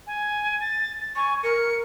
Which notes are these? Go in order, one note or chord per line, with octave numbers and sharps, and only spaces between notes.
G#5
A6
A6
G#5 C#6
A#4 C#7